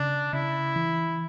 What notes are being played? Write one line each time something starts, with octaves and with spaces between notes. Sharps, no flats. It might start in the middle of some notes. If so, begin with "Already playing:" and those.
Already playing: C#3 D4
C#3 E4
E3